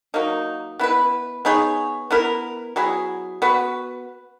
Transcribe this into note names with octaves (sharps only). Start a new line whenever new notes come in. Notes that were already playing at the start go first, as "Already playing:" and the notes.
F#3 A#3 D#4
B3 E4 B4
B3 D#4 G#4 C#5
B3 E4 A#4
F#3 B3 E4 G#4
B3 F#4 B4